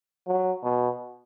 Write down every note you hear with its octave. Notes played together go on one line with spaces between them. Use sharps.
F#3
B2